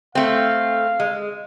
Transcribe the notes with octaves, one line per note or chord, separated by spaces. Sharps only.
A3 C4 F5
G#3